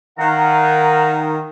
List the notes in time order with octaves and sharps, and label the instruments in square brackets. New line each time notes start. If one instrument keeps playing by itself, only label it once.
[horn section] D#3 [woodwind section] F5 F#5 A#5